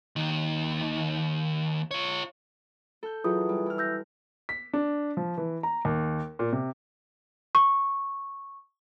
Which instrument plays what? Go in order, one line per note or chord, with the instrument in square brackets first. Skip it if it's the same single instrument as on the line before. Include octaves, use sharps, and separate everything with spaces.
[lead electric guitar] D#2 D#3
F4 C#5
[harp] A4 G6
[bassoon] E3 [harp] F#3 [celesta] F4 G#4 D#6
[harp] G3
E4 F6
[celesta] E6 G6 A#6
[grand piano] B6
D4
F3
E3
A#5
D#2
A#2
C3
[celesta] C#6